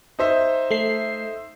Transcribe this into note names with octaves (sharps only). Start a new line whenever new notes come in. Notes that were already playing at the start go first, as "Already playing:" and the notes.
D#4 C5 E5
A3 C7